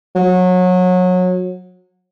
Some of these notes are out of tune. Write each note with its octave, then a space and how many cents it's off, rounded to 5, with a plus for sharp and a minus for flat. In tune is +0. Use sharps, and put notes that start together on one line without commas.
F#3 -25